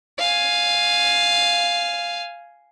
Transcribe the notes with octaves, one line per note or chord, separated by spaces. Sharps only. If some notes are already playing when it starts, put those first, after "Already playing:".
F5 G#5